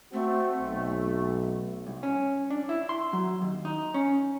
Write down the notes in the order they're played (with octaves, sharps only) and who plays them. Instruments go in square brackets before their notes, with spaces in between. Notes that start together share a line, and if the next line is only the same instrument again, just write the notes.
[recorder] A3 [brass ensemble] C4 F#4
[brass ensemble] B1
[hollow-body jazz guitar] C2
C#4
D4
E4
C6
F#3
D#2
D#4
C#4